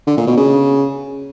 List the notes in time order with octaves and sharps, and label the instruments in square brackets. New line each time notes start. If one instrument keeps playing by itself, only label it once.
[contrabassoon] D3
A#2
B2
C#3